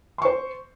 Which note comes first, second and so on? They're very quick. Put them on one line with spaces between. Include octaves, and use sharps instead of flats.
C6 C#6 C5